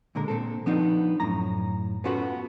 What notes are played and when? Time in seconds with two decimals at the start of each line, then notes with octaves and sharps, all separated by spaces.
0.15 A#2 D3 G#3 A#4
0.28 A#2 C4 A4
0.66 F3 B3 C4 D4 D#4 F4
1.20 F#2 A2 A#5
2.04 B3 C#4 F4 F#4 A4 B4